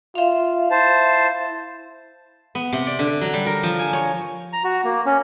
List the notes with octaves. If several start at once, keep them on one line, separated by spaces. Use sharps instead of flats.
F4 E5 F5
E4 C5 A5
B3
C3
D5
D3
F#3
G3
A#4
F3
G#5
C#5
A#5
F#4
A#3
C#4